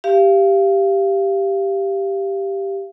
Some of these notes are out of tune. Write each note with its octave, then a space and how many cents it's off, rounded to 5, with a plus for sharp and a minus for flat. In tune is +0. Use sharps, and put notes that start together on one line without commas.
G4 +0 F5 -25